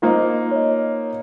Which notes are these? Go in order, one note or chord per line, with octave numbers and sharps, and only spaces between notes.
A#3 D#4 F4 A#4 C5 D#5
C#5 D#5